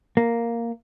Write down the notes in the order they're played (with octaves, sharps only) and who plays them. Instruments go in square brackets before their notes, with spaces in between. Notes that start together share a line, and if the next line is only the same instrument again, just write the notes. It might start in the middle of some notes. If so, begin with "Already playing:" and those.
[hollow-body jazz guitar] A#3